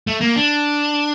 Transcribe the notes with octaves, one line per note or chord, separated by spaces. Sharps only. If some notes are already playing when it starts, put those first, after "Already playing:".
A3
A#3
D4